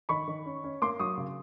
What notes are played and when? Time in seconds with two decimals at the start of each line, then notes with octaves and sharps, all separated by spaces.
0.09 D#3 B5 C#6
0.28 D#3
0.46 C#4
0.64 C#4
0.82 A#3 C6 D6
1.00 F#3 C#6 D#6
1.17 C#3